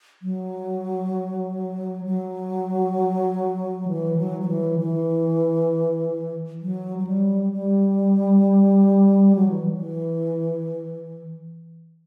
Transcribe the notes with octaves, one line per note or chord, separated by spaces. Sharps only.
F#3
F#3
E3
F#3
F#3
E3
E3
F#3
F#3
G3
G3
F#3
E3
E3